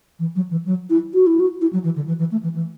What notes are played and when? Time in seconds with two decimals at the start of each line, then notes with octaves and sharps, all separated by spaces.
0.19 E3
0.36 F#3
0.51 E3
0.66 F#3
0.90 E4
1.14 F#4
1.26 E4
1.40 F#4
1.61 E4
1.73 F#3
1.84 E3
1.96 D3
2.08 E3
2.19 E3
2.31 A3
2.43 E3
2.55 E3